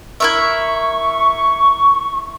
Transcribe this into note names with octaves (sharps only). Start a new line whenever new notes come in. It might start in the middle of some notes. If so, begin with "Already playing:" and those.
E4 A#4 E5 C#6